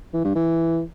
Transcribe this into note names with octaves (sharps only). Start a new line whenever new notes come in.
E3
G2
E3